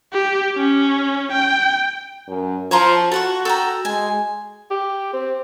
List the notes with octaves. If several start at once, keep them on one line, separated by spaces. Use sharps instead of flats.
G4
C#4
G5
F#2
F3 C#5 A#5 C6
F#4 A4 F#5 C#6
A4 G5 A#5
G#3 G#5
G4
C4